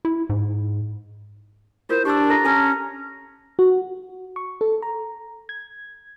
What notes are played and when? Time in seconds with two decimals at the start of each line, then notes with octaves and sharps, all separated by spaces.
0.05 E4
0.30 G#2
1.89 E4 F4 A#4 C5
2.05 D4 G4 E6
2.30 A4 A#5
2.44 C#4 A4 G#5 A5
3.59 F#4
4.36 C#6
4.61 A4
4.82 A#5
5.49 G#6